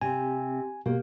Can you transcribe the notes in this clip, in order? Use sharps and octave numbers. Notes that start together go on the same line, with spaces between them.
C3 C4 G4 G#5
B2 A#3 G4